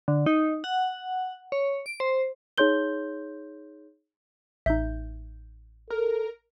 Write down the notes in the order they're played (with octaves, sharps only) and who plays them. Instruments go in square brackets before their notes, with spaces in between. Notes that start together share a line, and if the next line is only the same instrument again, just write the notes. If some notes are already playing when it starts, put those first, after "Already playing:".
[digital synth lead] D3
D#4
F#5
C#5
D7
C5
[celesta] D#4 G#4 C#5 C6 G6 G7
[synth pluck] A1 G6 [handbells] D#4 E5
[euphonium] A4 [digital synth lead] A#4